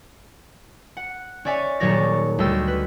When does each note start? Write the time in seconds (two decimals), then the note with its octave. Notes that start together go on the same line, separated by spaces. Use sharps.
0.97 F#5
1.45 C#4 C#5 D5 E5 G#5
1.80 D#1 D#3 F#3 C#5 D5 A#6
2.38 D2 G3 D#5 G5 E6 A6
2.68 B4